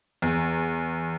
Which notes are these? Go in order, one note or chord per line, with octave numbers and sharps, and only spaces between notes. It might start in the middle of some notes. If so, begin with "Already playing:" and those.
E2